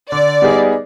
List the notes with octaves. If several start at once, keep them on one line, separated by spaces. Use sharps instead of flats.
D3 D5
G3 B3 D#4 G#4